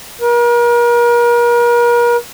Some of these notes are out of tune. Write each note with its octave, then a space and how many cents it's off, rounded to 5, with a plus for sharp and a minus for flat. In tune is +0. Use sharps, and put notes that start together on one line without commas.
A#4 +40